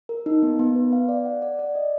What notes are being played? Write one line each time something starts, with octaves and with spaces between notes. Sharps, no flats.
A#4
D#4
B3
B3
B4
F5
D5
F#5
D5
D5
D#5